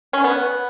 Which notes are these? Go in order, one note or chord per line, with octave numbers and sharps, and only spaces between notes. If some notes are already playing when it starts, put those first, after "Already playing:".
C#4
B3